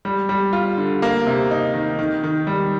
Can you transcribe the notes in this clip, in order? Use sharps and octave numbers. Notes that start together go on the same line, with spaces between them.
G3
G3
F4
D3
A#3
C3
D#4
D#3
D#3
D#3
G3